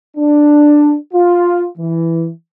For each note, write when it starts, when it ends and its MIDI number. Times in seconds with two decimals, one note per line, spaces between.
0.17 0.96 62
1.13 1.66 65
1.78 2.30 52